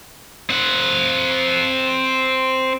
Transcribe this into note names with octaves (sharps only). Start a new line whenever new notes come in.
C4 F#5